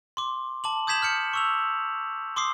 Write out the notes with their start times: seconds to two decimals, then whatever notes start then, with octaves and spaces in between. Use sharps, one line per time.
0.17 C6 D6
0.64 A5 D6 F#7
0.87 D#6 G6 G#6 B6 E7 F#7
1.02 F6 G6 C#7
1.33 C#6 E6 F7
2.36 C6 D6 D#6 C7